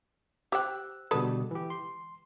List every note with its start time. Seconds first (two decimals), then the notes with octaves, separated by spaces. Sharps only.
0.52 G4 C5 G5 E6 F#6
1.11 B2 D3 G3 G#3 A4 B4
1.51 E3 G4
1.70 C6